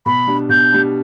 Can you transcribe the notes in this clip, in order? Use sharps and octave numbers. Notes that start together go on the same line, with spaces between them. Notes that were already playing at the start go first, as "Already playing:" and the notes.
B2 B5
G3 D4
B2 G6
G3 D4